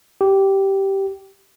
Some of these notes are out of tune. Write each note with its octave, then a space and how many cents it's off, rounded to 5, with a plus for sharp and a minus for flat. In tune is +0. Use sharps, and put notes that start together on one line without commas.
G4 -10